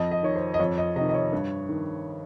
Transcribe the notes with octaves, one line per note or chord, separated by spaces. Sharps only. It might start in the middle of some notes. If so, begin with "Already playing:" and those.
Already playing: F2 D#5
D#5
D#3 C#5
C5
D#5
F2 C#5
D#5
C3 D#3 D#5
D#5
C#5
G2
D#3